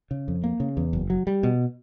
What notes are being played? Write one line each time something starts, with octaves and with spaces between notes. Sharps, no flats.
C#3
F2
A#3
C#3
E2
F#1
F#3
G3
B2